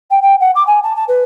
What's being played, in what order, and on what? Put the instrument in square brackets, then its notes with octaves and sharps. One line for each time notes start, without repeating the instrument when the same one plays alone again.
[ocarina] G5
G5
F#5
D6
G#5
A5
A5
B4